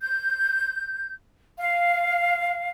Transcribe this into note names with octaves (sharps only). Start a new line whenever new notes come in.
G6
F5